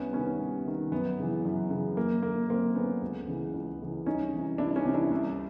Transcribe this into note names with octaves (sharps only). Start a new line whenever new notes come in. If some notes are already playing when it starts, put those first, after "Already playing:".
Already playing: C2 B3 C#4
C3 D#3 B3 C#4
C2
C3 D#3
F#2 B3
C#3 E3
F#2
C#3 E3
F#2 A#3
D3 A#3
F#2 A#3 C4
D3 B3 C#4
C#2
C#3 E3
C#2
C#3 E3
C2 C#4 D#4
C3 E3
C2 D4 E4
C#4 D#4
C3 E3
D4 E4
C2